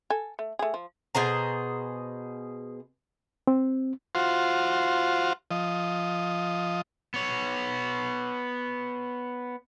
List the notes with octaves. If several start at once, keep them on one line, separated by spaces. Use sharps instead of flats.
A4 G#5
A3
A3 G#4
F3
B2 G#4 C5 A#5
C4
F4 F#4 C5
F3 D#5
B3 C#5